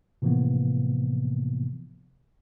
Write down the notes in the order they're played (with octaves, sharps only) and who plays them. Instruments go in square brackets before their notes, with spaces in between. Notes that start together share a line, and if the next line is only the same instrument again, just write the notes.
[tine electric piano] A2 C3 E3 F3 A#3 B3